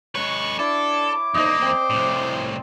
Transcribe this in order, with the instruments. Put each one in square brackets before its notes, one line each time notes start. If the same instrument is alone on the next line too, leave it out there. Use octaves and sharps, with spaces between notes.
[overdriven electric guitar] G#3 B4 [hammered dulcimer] C#5 [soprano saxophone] C#6
[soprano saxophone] D4 [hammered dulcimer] E4 [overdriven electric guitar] A4 [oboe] D6
[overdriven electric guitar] E2 A#3 [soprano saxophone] D#4 [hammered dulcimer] C5 D5 D#5
[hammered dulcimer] C4 [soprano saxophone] C5
[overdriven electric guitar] C2 A2